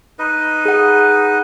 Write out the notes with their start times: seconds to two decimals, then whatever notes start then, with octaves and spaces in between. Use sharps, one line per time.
0.19 D#4 B4 D#5
0.65 G#4 F#5